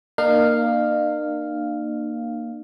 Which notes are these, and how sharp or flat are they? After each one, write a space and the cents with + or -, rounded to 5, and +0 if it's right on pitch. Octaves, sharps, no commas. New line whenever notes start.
A#3 +0 D#4 -45 F5 +0